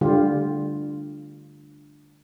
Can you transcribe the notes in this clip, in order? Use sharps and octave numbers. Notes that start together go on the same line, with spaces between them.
D3 G3 F4 G4